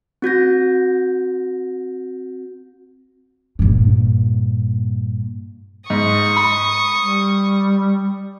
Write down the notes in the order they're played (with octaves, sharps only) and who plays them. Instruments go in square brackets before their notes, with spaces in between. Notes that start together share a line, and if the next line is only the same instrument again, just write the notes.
[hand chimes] C4 F#4 G6 A#6
[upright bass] G2 A#2
[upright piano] G#2 [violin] C#6 D#6
[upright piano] B5
[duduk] G3